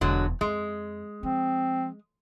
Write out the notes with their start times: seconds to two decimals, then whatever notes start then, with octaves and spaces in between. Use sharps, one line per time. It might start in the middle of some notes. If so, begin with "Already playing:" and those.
0.01 E1 D3 E3 F#3 G#3
0.41 F2 G#3
1.23 F3 C4